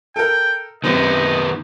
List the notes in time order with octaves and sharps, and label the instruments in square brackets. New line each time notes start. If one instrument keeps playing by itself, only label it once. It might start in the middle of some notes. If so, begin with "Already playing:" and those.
[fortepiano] A4 A#4 [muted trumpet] G5
[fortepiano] F#2 C4 G4 [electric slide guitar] D#3 B3 [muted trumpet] D#5